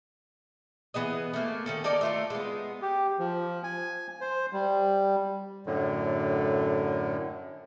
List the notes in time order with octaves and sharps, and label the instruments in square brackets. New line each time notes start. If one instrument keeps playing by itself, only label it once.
[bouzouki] E3 B3 G#4 D#5
A3 A#3
D#3 C#4 A4
D#4 A4 A#4 D5
A3 F4 A4
G#3 B3
[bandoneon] G4
F3
G#5
C5
G3
F#2 A2 D3